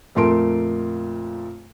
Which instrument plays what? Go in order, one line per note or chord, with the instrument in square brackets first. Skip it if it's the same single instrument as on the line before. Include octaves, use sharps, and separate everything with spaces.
[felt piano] F2 A#2 A3 A#4 C6 D7